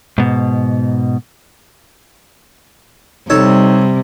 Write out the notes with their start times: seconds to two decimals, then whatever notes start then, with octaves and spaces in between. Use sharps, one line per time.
0.18 G#2 B2
3.30 C3 G3 D#4 A4 C#5